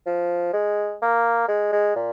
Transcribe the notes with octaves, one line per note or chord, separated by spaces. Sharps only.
F3
G#3
A#3
G#3
G#3
A#2